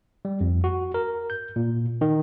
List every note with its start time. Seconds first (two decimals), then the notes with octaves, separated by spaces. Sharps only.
0.25 G3
0.41 F2
0.64 F#4
0.94 A#4
1.30 G6
1.56 A#2
2.01 D#3